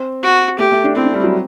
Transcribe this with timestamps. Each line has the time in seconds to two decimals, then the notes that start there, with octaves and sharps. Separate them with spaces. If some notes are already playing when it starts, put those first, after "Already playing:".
Already playing: C4
0.23 F#4
0.59 A3 G4
0.72 A3
0.84 D4
0.95 C4 E4
1.05 D4
1.14 G3
1.24 F#3